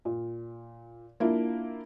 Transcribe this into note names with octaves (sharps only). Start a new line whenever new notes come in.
A#2
A#3 D4 E4 F4